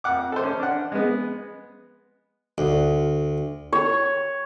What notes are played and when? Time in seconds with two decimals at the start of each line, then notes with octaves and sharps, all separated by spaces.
0.04 F2 F#5 D6
0.32 A4 C5
0.43 C#4
0.59 D4 F#5
0.92 G#3 B3
2.58 D2
3.72 C#5